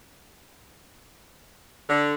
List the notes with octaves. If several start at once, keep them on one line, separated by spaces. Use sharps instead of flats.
D3